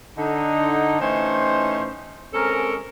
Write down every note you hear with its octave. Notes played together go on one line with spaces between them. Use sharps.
D3 D#4
A2 E3 C#4 D#4 C5
G#3 C4 C#4 A4 A#4